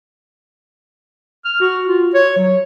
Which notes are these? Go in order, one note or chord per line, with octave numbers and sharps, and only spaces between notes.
F6
F#4
F4
C#5
F#3